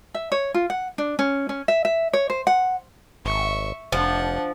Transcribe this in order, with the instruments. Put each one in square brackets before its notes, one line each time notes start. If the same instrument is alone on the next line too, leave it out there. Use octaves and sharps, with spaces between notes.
[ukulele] E5
C#5
F4
F#5
D4
C#4
C#4
E5
E5
C#5
C5
F#5
[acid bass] G#1 [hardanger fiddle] E5 C#6
[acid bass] F1 [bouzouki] F3 [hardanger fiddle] D4 F#5